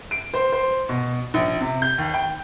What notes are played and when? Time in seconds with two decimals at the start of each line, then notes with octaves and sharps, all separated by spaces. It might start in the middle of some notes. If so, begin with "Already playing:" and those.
0.11 D7
0.34 C5
0.52 C5
0.89 B2
1.34 A#1
1.61 C3
1.82 G6
1.98 D#2
2.14 G5